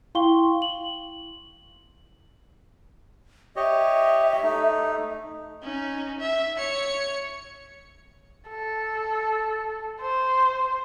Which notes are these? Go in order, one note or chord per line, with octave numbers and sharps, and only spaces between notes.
E4 F5 G5 C6 C#6 G7
F#7
G4 C#5 D#5 E5
A3 D#4
C#4 D#4
E5
C#5 C#7
A4
C5